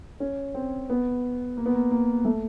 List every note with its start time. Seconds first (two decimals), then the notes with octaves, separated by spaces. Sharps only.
0.20 C#4
0.54 C4
0.90 B3
1.57 A#3
1.66 B3
1.74 A#3
1.91 A#3
2.25 A3